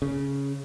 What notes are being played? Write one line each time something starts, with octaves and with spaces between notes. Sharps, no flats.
C#3